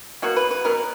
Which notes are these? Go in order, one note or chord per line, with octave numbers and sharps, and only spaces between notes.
B2 F#3 A#3 F#4
B4
B4
B2 F#3 B3 A#4